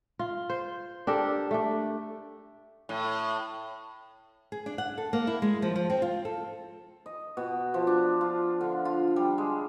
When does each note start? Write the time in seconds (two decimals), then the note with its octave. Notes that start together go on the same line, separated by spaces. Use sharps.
0.19 F4
0.50 C5
1.07 D4 G4 A4 A#4
1.51 A3 D4
2.89 A2
4.52 G#4
4.66 D4
4.78 F#5
4.98 A4
5.13 A#3
5.27 E4
5.42 G#3
5.62 F3
5.76 F3
5.90 C4
6.02 F4
6.25 A4
7.06 D#5
7.37 B2
7.74 F3
7.87 D4
8.21 F4
8.61 D3
8.85 F4
9.16 G3
9.38 G#3